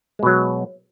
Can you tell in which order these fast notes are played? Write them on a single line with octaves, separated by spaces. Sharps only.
G#3 B2 F#3